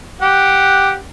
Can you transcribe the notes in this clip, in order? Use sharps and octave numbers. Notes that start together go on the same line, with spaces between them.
G4 F#5